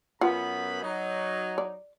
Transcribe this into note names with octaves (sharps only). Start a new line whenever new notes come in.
F#2 B3 F4 F#5 B5
F#3 D#4
D5